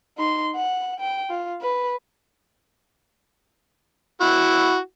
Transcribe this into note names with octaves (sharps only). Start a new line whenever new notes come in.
D#4 C6
F#5
G5
F4
B4
E4 F#4